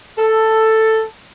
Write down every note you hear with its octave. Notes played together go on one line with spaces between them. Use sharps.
A4